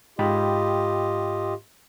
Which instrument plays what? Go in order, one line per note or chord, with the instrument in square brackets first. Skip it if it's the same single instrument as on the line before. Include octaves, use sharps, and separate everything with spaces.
[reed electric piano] G#2 G5 B5 [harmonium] F4 G4 D#5